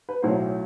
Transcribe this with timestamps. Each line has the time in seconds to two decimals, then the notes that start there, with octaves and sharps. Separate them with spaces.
0.09 B4
0.22 B1 A2 F#3 C5